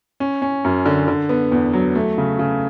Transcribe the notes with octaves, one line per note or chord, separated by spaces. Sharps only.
C#4
C#4
F#2
D3
D3
B3
E2
F#3
A3
C#3
C#3